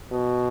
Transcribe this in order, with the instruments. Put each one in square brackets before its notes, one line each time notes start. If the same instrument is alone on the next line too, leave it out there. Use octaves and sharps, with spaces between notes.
[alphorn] B2